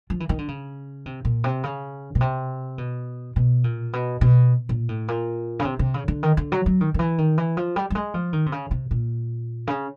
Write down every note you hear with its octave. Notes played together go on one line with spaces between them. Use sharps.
F3
E3
D#3
D3
C#3
C3
A#2
C3
C#3
B2
C3
B2
B2
A#2
B2
B2
A#2
A2
A#2
C#3
C3
C3
C#3
D3
D#3
D3
F#3
F#3
D#3
D#3
E3
D#3
E3
F3
G3
G3
G#3
F3
D#3
C3
C#3
C3
A#2
C#3